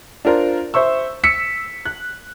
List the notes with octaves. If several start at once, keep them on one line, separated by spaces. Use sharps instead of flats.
D4 F4 A#4 C5
C5 E5 C#6 E6
E6 B6 C#7
F#6